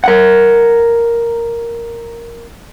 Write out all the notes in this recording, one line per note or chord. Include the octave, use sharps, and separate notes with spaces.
A#4 F#5